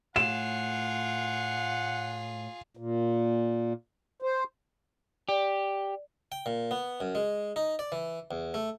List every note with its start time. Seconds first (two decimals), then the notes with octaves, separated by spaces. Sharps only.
0.16 A2 F4 G#4 F#5 E7
2.77 A#2
4.22 C5
5.29 G4 D5
6.32 G5
6.46 A#2
6.71 B3
7.00 F#2
7.15 G#3
7.56 D#4
7.79 D5
7.92 E3
8.31 E2
8.54 A3